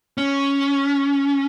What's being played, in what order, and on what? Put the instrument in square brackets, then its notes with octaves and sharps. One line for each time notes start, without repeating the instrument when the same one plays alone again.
[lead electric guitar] C#4